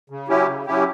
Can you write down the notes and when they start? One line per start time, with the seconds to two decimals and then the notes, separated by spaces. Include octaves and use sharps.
0.10 C#3
0.28 F#3 C#4 E4 G4
0.47 C#3
0.66 F#3 C#4 E4 G4